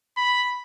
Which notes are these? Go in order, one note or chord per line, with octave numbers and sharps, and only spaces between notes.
B5